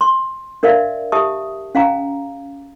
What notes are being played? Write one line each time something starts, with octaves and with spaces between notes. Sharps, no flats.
C6
D4 A#4 D5 E5 F5
G4 E5 A5 D#6
C#4 F5 G#5 A#5